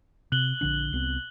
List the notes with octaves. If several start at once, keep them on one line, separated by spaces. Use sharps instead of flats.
C3 F#6 F#7 G7
A#1 D3 D4
C2 B3 C4